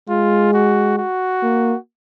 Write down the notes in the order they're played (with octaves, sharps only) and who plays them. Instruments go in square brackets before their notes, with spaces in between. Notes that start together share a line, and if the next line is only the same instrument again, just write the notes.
[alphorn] G#3 [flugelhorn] F4
[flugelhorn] F#4
F#4
[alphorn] A#3